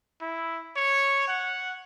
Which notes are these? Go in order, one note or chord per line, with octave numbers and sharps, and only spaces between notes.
E4
C#5
F#5